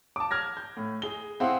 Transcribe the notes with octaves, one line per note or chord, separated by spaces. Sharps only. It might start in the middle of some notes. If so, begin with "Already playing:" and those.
A5 D6
F6 G#6 A#6
G6
A2
G#4 G7
C4 E4 G#4 F5 F#5 C6